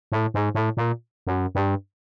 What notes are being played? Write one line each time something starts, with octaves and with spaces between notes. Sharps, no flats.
A2
G#2
A2
A#2
F#2
G2